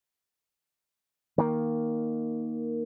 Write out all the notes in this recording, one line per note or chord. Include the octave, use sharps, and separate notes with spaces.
D#3 A#3